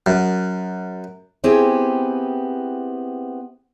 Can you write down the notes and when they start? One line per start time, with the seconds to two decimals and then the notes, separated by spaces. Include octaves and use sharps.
0.06 F#2
1.44 B3 C4 E4 G4 G#4 G#5